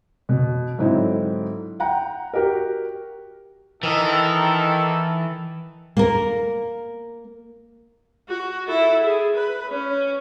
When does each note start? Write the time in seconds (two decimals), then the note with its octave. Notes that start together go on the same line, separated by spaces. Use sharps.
0.29 B2
0.78 G#2 D3 F#3 C4 D#4 E4
1.80 F#5 G5 A#5
2.33 F#4 G4 A#4
3.83 D#3 E3 A4
5.97 A#3 A#4
8.28 F#4
8.67 E4 A4
9.02 G#4
9.36 B4
9.68 C#4